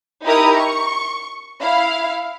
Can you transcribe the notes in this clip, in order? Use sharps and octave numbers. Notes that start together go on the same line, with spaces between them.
D#4 E4 G4 A#4 A#5 D#6
C#6
E4 F5